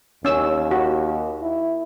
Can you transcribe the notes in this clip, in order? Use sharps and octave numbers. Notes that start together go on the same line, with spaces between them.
D#2 C#4 E6
F#4
E4